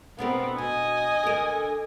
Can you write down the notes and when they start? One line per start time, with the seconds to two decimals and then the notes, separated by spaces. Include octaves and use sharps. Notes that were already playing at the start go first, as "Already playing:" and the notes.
0.19 B2 B3 C4 D4 A#4
0.58 B2 D#5 G#5
1.23 D3 A#4